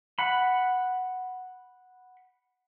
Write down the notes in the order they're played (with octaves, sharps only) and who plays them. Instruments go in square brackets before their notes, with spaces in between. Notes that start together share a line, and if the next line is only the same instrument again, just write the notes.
[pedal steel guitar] F#5 B5